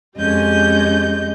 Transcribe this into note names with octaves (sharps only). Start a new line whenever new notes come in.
F2 G#3 C#4 G4 D#5 G6